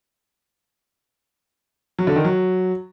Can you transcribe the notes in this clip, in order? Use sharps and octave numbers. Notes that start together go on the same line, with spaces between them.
F#3
D3
D#3
F#3